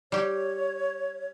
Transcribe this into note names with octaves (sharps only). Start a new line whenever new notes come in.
G3 G4 C#5